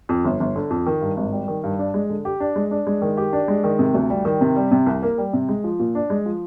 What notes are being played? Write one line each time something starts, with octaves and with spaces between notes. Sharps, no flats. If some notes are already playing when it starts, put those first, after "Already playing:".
F2
G1
G1
D3
F2
D#3
G2
G#1
G3
D#3
G2
D4
G#3
D3
G4
D4
G#3
D4
G#3
D#3
G4
D4
G#3
D#3
C3
D2
G3
D#3
C3
G3
C3
C2
A#3
G3
C3
G#3
F3
A#2
D4
G#3
F3